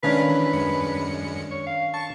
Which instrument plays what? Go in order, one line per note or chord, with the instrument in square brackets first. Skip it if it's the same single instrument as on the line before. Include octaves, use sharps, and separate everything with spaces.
[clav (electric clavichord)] D#3 C#4 D4 [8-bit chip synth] G#3 A#4 F5 [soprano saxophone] B4
[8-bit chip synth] E3
F#2 G#3 C#7
[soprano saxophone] C#5
F5
[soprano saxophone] A5 [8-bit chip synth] C#6